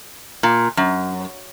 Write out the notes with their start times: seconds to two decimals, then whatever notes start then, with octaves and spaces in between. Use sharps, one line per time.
0.43 A#2
0.77 F#2